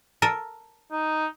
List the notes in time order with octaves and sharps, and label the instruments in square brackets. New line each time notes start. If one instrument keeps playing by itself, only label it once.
[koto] A4 A#4
[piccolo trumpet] D#4